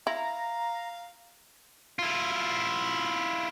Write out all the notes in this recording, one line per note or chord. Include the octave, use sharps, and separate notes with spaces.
E4 F5 A#5
E4 F4